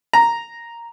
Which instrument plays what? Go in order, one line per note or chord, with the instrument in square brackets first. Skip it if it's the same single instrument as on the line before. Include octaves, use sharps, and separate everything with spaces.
[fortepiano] A#5